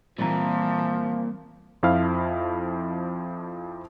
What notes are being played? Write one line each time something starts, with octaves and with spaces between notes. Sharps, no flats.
A#2 E3 F3 G3 C4 A#5
F2 F3 E4 F5 F6